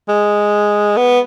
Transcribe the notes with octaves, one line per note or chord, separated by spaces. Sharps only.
G#3
B3